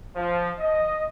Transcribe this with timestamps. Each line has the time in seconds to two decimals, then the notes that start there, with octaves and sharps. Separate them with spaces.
0.16 F3
0.59 D#5